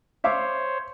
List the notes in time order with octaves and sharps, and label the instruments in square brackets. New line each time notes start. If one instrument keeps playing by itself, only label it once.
[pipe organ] C5 C#5 [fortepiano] E5 F5 D6